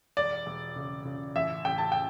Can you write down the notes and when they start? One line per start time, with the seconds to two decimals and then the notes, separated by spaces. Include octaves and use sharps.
0.17 E1 D5
0.46 E1
0.76 C#3
1.05 C#3
1.36 A1 E5
1.65 A1 G5
1.78 A5
1.92 G5